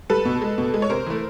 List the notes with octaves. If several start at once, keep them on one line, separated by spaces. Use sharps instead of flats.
G3 A4 B4
B2
G#3
B2
G#3
C#5
C3 A#4 C5
E3 A3